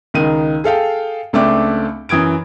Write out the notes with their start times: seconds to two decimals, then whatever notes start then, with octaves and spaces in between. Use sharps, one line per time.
0.14 C#2 D#3 D#4 D#7
0.64 G#4 A4 F5 G5
1.33 C#2 A3 C4 D4 E5 D6
2.09 F#2 E3 D#6 G#6 D7